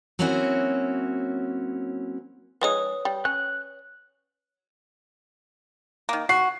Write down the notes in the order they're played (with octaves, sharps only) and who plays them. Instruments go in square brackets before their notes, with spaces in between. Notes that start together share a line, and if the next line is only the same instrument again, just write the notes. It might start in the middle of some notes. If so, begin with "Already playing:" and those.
[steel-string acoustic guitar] F#3 A#3 C4 C#4 E4 F#4
[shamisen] F3 G#3 D#4 [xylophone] B4 C#5 D#6
[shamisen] G3
[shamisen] C#4 [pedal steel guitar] F#6
[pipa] D#3 A#3
[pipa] F#4 [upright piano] C7